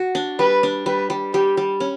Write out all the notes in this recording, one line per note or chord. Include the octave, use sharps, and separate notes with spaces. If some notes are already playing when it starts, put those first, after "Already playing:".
Already playing: F#4
D4
G3 B4
D4
G3 B4
G3
G3 G4
G3
C#4